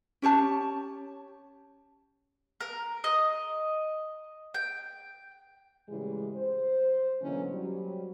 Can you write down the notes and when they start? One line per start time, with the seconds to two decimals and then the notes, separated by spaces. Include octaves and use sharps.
0.22 C#4 G4 C#5 A5
2.61 A#4
3.04 D#5
4.54 G5
5.89 A2 C#3 E3 G3 G#3
6.36 C5
7.21 B2 D3 E3 F#3 A#3 C#4
7.51 F#3 G3